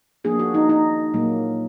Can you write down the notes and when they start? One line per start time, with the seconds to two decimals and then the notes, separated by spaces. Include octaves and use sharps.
0.24 F3 A#3 D4 G#4
0.39 F#4
0.54 D#4
0.69 D#4
1.14 A#2 F#3 A#3